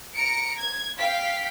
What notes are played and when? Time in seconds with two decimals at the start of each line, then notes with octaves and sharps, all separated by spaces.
0.14 A#5 C#7 D7
0.57 G#6
0.98 F5 G5 B6